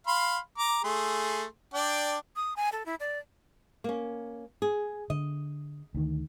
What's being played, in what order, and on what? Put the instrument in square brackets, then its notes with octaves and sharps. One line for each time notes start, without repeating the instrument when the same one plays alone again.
[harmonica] F5 B5 C6
A#5 D6
A3 G#4 C6
D4 D5 G5
[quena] D#6
G#5
A4
E4
D5
[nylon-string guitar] A#3 C#4
G#4
[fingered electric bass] D3 [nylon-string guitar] D#5
[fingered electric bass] D2 D#3